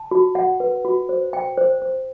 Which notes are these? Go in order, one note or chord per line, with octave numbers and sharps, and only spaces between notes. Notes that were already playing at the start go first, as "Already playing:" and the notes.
Already playing: A5
F#4
F#5
B4
F#4
C5
G5
C5
C5